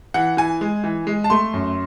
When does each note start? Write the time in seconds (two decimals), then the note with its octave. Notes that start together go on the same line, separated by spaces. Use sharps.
0.14 E3 F#5
0.37 E3 G#5
0.61 G#3
0.84 E3
1.07 G#3
1.24 A5
1.30 A3 C6
1.53 F#2